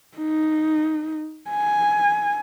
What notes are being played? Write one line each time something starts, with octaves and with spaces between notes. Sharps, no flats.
D#4
G#5